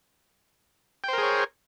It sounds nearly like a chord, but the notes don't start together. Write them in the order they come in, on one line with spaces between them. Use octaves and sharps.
G5 C5 A#4 G#4 C#5